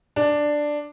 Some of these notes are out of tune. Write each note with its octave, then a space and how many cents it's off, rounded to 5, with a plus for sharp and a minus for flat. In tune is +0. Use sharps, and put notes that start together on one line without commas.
D4 +5